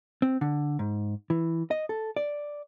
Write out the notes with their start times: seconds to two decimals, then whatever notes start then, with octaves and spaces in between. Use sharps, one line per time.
0.22 C4
0.41 D3
0.79 G#2
1.30 E3
1.71 D#5
1.89 A4
2.17 D5